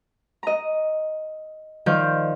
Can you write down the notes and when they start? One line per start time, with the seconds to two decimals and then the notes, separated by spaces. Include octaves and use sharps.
0.43 D#5 A#5
1.86 D#3 F3 C5 D5 F5 G6